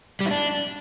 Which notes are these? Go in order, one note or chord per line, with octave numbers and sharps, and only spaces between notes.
G3
E4
D4